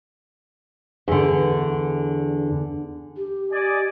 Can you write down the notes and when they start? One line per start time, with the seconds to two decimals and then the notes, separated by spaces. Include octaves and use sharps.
1.08 E2 D3
3.17 G4
3.52 D5 D#5 G#5